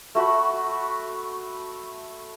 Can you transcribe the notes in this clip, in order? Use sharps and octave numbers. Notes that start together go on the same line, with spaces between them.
A3 F#4 B5